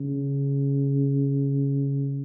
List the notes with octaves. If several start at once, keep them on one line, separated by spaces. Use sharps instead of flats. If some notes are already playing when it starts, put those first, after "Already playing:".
Already playing: C#3